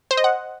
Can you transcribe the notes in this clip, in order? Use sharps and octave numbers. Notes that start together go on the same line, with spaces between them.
C5
D#5
F#5